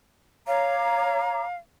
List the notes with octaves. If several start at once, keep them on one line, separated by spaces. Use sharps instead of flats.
C#5 F5 A#5 D6